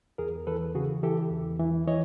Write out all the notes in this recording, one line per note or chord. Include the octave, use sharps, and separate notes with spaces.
E2 G#4 A#4
E3 A4 B4
C#3 F#4 G#4
E3 G4 A4
E2
E3
E3 C#5 D#5